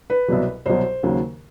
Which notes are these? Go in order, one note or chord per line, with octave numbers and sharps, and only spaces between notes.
B4
C2 B2 F#3
C2 B2 F#3 C5
D#2 C#3 F#3